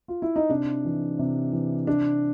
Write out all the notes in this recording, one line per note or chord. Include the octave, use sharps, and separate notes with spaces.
F4
E4
D#4
C3 D4
E3
C3
E3
C3 D4